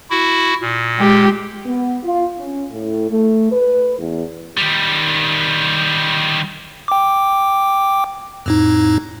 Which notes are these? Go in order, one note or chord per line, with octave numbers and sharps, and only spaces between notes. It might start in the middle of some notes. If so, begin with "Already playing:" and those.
E4 F#4
A#2
G#3 G4
B3
F4
C#4
A2
A3
B4
E2
D#3 G3
G5 D6
F2 A2 D#4